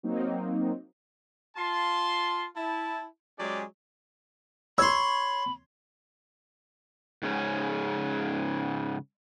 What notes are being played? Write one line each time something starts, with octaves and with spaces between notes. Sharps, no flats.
F#3 A#3 C4 D#4
F4 A5 C6
E4 A5
F#3 G#3 C#4 G4 G#4 D5
C#5 B5 C6 E6
G#2 C#3 C#4